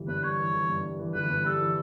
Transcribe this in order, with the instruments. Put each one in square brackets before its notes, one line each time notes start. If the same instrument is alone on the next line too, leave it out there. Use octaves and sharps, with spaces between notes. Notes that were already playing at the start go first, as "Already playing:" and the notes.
Already playing: [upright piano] G1 E3 G3
[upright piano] G2 [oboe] B4
[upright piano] G3 [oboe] C#5
[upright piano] E3
G1
G2
G3
E3
[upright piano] G1 [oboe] B4
[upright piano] G2
[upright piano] G3 [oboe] A4
[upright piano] E3